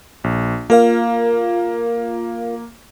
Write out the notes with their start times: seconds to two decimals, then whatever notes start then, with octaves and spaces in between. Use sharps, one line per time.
0.24 A#1
0.70 A#3 F4 A#4 F5